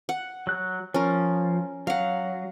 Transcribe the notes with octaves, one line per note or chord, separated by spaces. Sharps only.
F#5
F#3 F#6
F3 C#4 A#4
F#3 F5 F#5